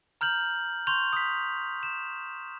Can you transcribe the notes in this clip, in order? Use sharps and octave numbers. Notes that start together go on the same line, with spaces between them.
A#5 F6 G6 F#7
C6 C#6 G6 F7
D#6 B6
E7